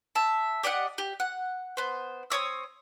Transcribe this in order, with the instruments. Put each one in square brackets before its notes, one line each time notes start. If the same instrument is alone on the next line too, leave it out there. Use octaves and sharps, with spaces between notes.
[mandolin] E5 A5
G4 D5 D#5 F#5
G4
F#5
B3 C5
C4 C#5 D#6 E6